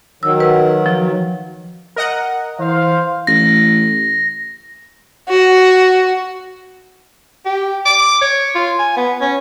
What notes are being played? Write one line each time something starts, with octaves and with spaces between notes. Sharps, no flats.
D#3 F#3 E6
B4
F3
A#4 D#5 F#5
E3 C5 F5
A1 A#6
F#4
G4
D6
C#5
F4
G#5
B3
C#4